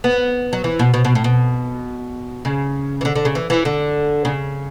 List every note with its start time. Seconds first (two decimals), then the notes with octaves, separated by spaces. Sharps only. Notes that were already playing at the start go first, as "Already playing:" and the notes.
0.04 B3
0.53 F#3
0.64 E3
0.79 B2
0.94 B2
1.05 B2
1.15 A2
1.24 B2
2.45 C#3
3.01 E3
3.05 D3
3.15 D3
3.25 C#3
3.35 E3
3.50 E3
3.65 D3
4.25 C#3